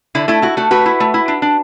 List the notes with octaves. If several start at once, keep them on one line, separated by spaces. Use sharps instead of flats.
D3 E4
A3 E4
E4 F#4
A3 F#4
A3 F#4 B4
E4
A3
E4
D4
D4